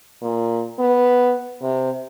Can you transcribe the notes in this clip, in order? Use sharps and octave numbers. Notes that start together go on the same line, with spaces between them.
A#2
B3
C3